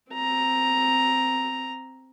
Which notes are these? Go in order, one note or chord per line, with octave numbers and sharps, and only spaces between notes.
C4 A#5